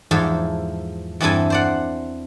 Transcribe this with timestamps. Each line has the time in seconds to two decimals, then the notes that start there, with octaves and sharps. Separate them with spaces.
0.11 E2 G#2 F3 A4
1.20 E2 G2 C4 E4 A4 G#5
1.50 C5 D5 F#5